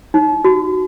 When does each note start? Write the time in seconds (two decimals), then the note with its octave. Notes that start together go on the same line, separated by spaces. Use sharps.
0.14 D#4
0.44 F#4